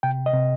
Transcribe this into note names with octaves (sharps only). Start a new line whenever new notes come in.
C3 G5
D#5
C3